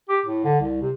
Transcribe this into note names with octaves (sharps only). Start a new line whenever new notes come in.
G4
A2
D3
C2
C3